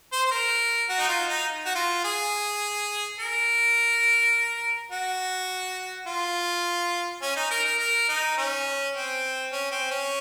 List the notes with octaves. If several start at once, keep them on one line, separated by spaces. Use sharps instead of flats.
C5
C5
A#4
F#4
D#4
F4
D#4
F#4
F4
G#4
A#4
F#4
F4
C#4
D#4
A#4
A#4
A#4
D#4
C#4
C4
C#4
C4
C#4